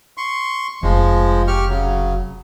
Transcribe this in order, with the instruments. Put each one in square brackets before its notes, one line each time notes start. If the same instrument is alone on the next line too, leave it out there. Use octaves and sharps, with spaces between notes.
[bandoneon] C6 C#6
[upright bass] F1 [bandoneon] F3 G#3
[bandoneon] G4 C#6 F6
C#3 F#3